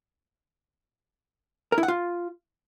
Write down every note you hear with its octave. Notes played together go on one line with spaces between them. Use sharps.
A#4
E4
F#5
F4